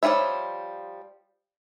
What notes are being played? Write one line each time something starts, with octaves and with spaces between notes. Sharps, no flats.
F3 G3 F4 C#5 E5